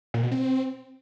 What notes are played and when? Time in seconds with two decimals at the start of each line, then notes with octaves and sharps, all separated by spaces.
0.14 A#2
0.23 B2
0.31 C4